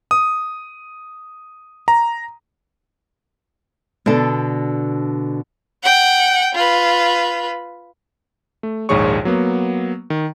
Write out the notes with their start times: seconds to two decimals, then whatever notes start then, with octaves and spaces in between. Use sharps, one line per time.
0.11 D#6
1.88 A#5
4.06 B2 D3 D4 A4
5.83 F#5 G5
6.55 F4 B4
8.63 A3
8.89 A#1 D#2 G#2 G#4 C#5 C#6
9.25 F#3 A#3 B3
10.10 D#3